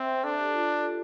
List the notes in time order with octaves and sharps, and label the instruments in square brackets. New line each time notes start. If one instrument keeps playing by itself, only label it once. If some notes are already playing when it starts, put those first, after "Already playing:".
Already playing: [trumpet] C4 [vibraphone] C5 E5
[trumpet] D4 [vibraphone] A4
[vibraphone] G4
F4